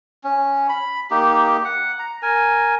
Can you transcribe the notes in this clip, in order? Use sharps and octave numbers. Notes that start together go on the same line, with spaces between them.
C#4
B5
A#3 D#4 G4
F#5
A#5
A#4 G#5